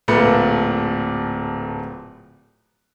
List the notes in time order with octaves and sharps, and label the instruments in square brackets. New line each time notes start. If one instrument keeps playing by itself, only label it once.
[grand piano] D1 A#2 A3 B4 C#7